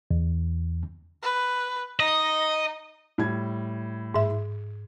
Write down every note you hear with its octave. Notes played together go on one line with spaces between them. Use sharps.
E2
B4
D#4 D#5
A2 G3 G#6
G#2 E5